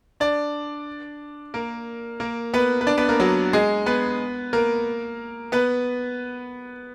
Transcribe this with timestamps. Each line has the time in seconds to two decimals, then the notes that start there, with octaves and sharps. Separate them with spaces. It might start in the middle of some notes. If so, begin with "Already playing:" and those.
0.20 D4 D5
1.54 A#3 A#4
2.20 A#3 A#4
2.54 B3 B4
2.81 B4
2.87 D4 D5
2.98 B3 B4
3.09 A#3 A#4
3.20 F#3 F#4
3.53 G#3 G#4
3.86 B3 B4
4.53 A#3 A#4
5.52 B3 B4